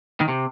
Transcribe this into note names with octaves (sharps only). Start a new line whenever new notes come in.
D#3
C3